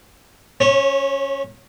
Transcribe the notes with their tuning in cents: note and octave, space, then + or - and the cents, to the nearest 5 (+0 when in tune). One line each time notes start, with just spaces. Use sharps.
C#4 +0 C#5 -35